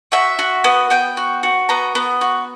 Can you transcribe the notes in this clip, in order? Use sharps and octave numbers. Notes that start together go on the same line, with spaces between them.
F#4 E5
F#4
B3
B3 G5
F#4
F#4
B3 A#5
B3
F#4